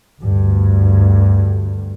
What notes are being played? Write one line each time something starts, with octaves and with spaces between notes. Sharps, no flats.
D2 G2